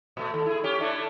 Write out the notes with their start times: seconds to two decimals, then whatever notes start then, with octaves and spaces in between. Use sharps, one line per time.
0.17 A#2 A3
0.34 D#2
0.46 E4 G#4
0.64 C#4 G4
0.80 A3 D4 E4